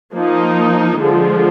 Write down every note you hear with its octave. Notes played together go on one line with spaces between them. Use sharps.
F3 A#3 D#4
D3 F3 G#3